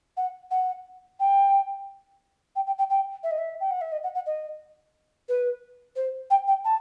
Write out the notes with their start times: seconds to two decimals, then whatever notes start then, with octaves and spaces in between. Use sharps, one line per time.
0.17 F#5
0.51 F#5
1.19 G5
2.56 G5
2.66 G5
2.78 G5
2.90 G5
3.23 E5
3.31 D#5
3.38 E5
3.60 G5
3.71 F#5
3.81 E5
3.92 D#5
4.03 F#5
4.15 F#5
4.26 D#5
5.29 B4
5.96 C5
6.30 G5
6.47 G5
6.65 A5